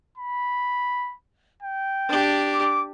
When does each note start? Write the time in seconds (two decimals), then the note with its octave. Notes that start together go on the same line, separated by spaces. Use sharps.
0.17 B5
1.62 G5
2.09 D4 G4
2.54 D6